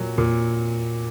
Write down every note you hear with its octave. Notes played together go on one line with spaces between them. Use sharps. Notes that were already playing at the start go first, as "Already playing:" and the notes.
Already playing: A#2 F#3
A#2